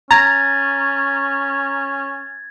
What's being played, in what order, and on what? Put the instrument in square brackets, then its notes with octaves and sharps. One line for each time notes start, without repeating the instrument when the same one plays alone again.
[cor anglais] C#4 [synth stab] A#5 [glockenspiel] G#6 A6